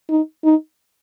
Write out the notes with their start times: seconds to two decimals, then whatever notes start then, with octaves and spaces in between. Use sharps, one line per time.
0.10 D#4
0.44 D#4